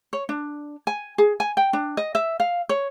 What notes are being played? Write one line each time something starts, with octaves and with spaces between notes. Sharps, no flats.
C#5
D4
G#5
G#4
G#5
G5
D4
D#5
E5
F5
C#5